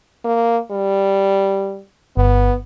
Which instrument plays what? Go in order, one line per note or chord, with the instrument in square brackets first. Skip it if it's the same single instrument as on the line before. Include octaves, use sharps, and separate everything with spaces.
[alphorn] A#3
G3
[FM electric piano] G1 [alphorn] B3